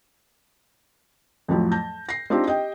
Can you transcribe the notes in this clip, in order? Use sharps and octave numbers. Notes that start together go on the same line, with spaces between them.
F2 A2 F3 F#3
A5 G6 A#6
A#6 C7
C4 D4 D#4 F4 G4 C5
G4 D#5 G5